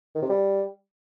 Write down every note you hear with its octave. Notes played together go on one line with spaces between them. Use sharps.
D#3
C3
G3